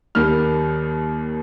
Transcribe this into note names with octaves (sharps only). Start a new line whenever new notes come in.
D#2 D#3 G3 F6